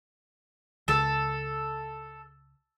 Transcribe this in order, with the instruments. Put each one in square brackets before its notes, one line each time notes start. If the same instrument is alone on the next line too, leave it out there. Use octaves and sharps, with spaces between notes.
[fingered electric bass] C#2 [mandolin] A4